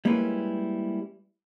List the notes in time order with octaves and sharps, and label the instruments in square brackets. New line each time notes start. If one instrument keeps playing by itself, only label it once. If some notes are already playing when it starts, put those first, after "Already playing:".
[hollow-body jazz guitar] G3 G#3 A#3 C#4 E4 B4